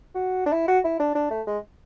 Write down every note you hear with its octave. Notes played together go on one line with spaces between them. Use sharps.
F#4
D4
E4
F#4
E4
D4
D4
A3
G#3